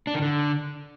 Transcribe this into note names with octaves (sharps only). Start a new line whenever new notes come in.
D4
D#3
D3